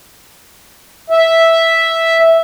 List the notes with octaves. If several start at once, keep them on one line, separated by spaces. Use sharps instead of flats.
E5